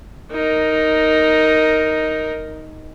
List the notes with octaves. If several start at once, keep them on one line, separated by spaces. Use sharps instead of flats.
D#4 A#4